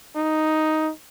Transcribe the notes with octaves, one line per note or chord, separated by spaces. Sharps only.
D#4